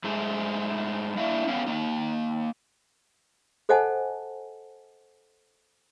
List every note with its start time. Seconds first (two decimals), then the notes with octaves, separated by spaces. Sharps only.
0.04 G#2 G#3 A3
1.18 A#3 D4 E4 E5 F5
1.47 B3 C#4 G4 F5
1.67 A#3 D#4
3.69 A4 C5 D#5 F#5 G#5 A5